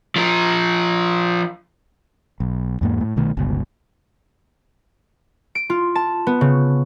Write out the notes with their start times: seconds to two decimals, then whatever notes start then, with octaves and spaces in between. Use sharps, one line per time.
0.16 F3 A#4
2.40 B1
2.81 E2 G#2 A#3
3.01 A2
3.16 C2 B2 D#3 A3
3.37 G1 C#2 B2
5.55 D7
5.70 F4
5.95 A5
6.27 B3
6.41 C#3